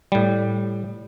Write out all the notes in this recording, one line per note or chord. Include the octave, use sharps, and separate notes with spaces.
A2 G3